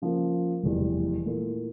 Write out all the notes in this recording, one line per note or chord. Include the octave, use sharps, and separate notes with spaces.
C#3 F3 A#3
F1 E2 E3 G3
A#2 A3 E4